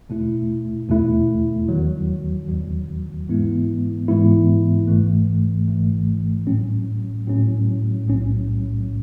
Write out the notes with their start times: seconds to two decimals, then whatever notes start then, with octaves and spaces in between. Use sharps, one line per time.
0.09 E2 B2 A3 E4
0.89 E2 B2 A3 E4
1.69 E2 D#3 F#3
2.48 E2 D#3 F#3
3.28 G#2 E3 G#3 B3 E4
4.08 G#2 E3 G#3 B3 E4
4.87 G#1 G#2 E3 A3
5.68 G#1 G#2 E3 A3
6.47 A2 F#3 C#4
7.28 A2 F#3 C#4
8.07 B1 A2 F#3 C#4